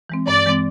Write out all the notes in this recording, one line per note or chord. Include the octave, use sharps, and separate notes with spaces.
E3 G#3 C4
G2 D5
E3 G#3 C4